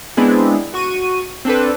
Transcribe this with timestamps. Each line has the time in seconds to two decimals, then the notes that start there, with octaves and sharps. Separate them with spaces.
0.17 G#3 B3 C4 D4 E4
0.74 F#4 C#6 D#7
1.45 C4 D4 A4 B4